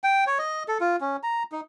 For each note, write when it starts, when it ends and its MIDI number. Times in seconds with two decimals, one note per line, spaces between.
0.04 0.24 79
0.27 0.38 73
0.39 0.63 75
0.68 0.78 69
0.81 0.96 65
1.01 1.17 61
1.23 1.43 82
1.52 1.61 63